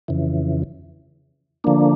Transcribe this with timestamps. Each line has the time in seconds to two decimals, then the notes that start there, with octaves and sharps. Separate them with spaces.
0.08 F2 C#3 E3
1.64 D3 F3 A#3 D4